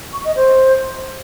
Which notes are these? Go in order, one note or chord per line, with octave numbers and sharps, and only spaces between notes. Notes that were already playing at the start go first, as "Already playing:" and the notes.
C#6
D#5
C5